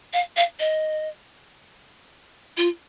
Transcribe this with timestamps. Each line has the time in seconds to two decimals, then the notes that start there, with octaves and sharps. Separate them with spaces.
0.13 F5
0.37 F5
0.60 D#5
2.57 F4